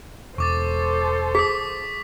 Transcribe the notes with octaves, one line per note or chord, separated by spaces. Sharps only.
E1 A4 C5 C#6 D6 A6
G#4 D#6 B6